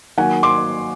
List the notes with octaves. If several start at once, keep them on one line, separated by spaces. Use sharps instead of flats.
D#3 F#3 A#3 F#5 G#5
C6 D6